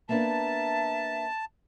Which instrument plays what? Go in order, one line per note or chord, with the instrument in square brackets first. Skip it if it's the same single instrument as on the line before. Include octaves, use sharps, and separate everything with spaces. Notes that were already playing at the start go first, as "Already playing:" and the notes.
[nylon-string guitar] A#3 B3 D4 [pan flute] E5 [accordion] A5